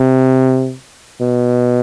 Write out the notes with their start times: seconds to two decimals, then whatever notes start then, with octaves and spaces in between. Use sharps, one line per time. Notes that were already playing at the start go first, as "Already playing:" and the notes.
Already playing: C3
1.21 B2